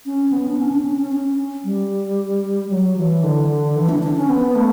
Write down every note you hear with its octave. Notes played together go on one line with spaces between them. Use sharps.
C#4
B3
D4
C#4
D4
C#4
C#4
C#4
G3
F#3
E3
D3
E3
D4
D4
C#4
B3
A3